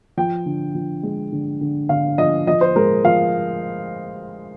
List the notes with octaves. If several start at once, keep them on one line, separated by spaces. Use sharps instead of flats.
F3 G5
D3
F3
G#3
D3
D3
D3 F5
F3 D#5
F3 D#5
C5
G#3 A#4
F3 F5